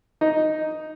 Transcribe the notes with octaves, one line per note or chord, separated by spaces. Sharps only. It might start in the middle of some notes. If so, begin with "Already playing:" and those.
D#4